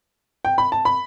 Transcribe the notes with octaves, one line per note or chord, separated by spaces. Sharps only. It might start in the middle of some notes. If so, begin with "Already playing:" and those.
G5
B5
A5
B5